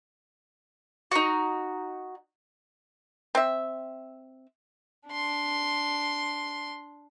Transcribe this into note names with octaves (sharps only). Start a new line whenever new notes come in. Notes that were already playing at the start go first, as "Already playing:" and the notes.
D#4 F#4
C4 E5
D4 C6